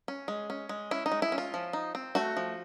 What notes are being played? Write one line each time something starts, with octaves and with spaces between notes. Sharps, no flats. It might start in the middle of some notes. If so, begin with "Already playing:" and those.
C#4
G#3
C#4
G#3
C#4 E4
D#4
G#3
E4
C#4
F4
F3
D#4
C4
A3 F#4
F3